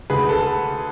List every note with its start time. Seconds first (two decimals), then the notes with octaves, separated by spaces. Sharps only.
0.10 D2 G#4 B4
0.29 A4